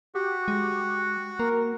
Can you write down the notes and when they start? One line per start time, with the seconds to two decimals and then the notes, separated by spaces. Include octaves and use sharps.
0.15 F#4 G4
0.48 G#3
1.39 A#3 A#4